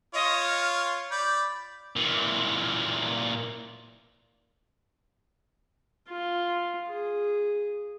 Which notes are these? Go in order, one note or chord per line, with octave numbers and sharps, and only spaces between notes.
F4 C#5 D#5
F6
D5 B5 G6
A#2 E3
F4
G#4